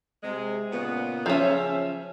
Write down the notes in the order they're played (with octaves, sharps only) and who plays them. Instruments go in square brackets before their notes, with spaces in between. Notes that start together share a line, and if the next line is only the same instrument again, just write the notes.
[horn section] C3 G#3
A#2 C#3 B3
[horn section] C#3 E5 [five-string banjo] F3 C#4